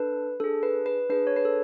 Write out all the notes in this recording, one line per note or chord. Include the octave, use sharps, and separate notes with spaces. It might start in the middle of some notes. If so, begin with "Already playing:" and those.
Already playing: D4 A4 B4
D4 G#4 A4
B4
B4
D4 G#4 B4
C#5
B4
A4